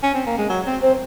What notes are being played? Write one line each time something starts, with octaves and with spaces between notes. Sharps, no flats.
C#4
C4
A#3
G#3
F#3
C4
C4 C5